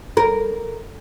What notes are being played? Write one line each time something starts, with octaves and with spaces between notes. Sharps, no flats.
A#4